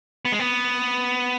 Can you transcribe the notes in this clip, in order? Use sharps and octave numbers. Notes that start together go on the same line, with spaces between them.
B3
G#3
B3